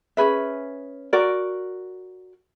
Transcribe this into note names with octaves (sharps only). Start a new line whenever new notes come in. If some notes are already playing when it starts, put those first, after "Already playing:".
C#4 G#4 B4 E5
F#4 A#4 D5